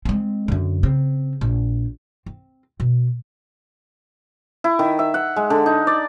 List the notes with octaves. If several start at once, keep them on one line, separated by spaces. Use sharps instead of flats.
G#3 C4
F#2 D3
C#3 C4
A#1
C4
B2
E4
D#3
E5
F#5
G#3
D3
D#4
D5